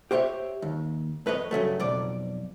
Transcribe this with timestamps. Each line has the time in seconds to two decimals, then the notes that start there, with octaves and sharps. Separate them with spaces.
0.11 G4 C5 C#5 E5
0.62 D#2
1.26 F2 B4 C#5 D#5
1.51 G2 C#3 F#3 A3
1.80 B1 F2 D5